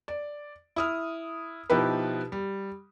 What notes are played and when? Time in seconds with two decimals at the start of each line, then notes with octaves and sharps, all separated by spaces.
0.08 D5
0.76 E4 D#6 F6
1.70 B2 F3 D#4 E4 G4 B4
2.32 G3